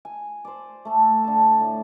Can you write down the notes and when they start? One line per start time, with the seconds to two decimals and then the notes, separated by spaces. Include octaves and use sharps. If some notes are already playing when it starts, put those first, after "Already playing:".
0.05 G#5
0.45 C5 D5
0.85 A3 A4
1.24 D3 A5
1.60 A2